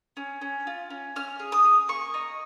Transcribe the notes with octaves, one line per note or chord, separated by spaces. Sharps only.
C#4
C#4
F4
C#4
C#4 F6
G#4
D#6
G#4
A#3 C#6
D#4